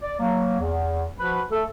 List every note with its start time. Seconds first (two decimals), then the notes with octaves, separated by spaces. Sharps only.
0.02 D5
0.19 F#3 A#3
0.59 E2
1.18 F3 F#4 B4
1.51 A3 A4